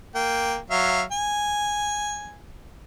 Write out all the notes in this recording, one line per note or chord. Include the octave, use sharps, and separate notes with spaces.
A#3 G5
F#3 E5 F5
G#5